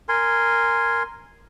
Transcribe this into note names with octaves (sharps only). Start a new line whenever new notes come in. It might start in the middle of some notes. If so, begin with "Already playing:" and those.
A#4 G#5 C6